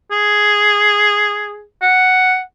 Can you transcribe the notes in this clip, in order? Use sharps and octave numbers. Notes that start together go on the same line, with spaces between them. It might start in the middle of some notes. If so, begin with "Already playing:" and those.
G#4
F#5